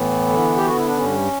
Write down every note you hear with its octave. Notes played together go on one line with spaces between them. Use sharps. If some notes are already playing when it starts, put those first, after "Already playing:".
Already playing: A2 E3 B3
D3
G4
D3 F#4
E4
D4
G2 C#4